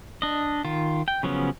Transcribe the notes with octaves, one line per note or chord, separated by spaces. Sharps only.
D4 D#5
D#3 F4
G5
C#3 F3 F#3 B3 C#4